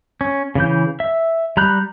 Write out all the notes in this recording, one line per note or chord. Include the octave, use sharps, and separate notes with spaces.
C#4
C#3 E3 G6
E5
G3 A#5 B5 F#6 G6